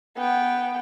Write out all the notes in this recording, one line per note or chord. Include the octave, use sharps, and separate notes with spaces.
B3 G5